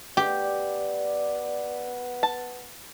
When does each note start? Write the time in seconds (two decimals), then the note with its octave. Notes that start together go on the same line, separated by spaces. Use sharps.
0.17 B3 G4 D5
2.23 A5